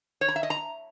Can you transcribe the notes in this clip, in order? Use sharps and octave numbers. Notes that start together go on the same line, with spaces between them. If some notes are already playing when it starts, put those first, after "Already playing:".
C#5
A#5
E5
D#5
A#5